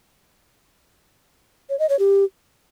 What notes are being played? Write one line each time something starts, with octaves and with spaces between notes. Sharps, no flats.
C#5
D#5
C#5
G4